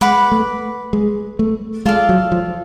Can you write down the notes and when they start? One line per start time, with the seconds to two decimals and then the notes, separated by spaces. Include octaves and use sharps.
0.01 G#3 B4 F#5 B5 D6
0.32 A3
0.93 G#3
1.39 A3
1.85 G#3 F4 A4 D5 F5
2.09 F#3
2.32 F3